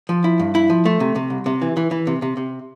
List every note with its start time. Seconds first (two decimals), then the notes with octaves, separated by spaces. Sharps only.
0.09 F3
0.24 E4
0.39 G2
0.55 E4
0.70 F3
0.85 A3
1.00 C3
1.16 C3
1.30 C2
1.46 C3
1.62 E3
1.77 E3
1.91 E3
2.07 C3
2.22 C3
2.37 C3